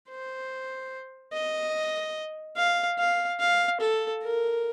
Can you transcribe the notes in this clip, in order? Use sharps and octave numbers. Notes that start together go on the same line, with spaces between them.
C5
D#5
F5
F5
F5
A4
A#4